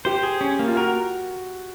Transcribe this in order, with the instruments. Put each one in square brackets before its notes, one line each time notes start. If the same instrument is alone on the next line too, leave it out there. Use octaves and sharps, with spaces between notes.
[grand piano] G4 [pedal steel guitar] C5
[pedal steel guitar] G#4
C#4
A#3
[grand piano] F4
[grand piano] F#4 [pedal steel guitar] A#4